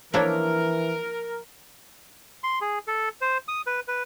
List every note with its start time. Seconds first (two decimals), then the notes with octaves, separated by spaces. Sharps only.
0.14 E3 F3 A#3 D4 E4 A#4 C#5
2.44 C6
2.61 G#4
2.88 A4
3.21 C5
3.48 D#6
3.67 B4
3.88 B4